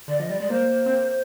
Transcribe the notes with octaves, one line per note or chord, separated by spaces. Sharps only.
D3 D5
F3 D#5
G3 D5
G#3 D5
A#3 C5
C4
A#3